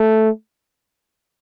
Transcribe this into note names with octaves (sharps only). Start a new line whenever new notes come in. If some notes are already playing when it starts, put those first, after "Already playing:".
Already playing: A3